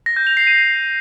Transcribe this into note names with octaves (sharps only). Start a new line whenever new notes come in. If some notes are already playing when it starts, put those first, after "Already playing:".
A#6
G6
F7
C7
D#7